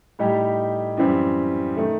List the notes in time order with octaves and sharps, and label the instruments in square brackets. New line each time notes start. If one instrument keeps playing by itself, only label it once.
[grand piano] A2 G3 D#4 G4
F#2 E3 G3 C4
D#3 A3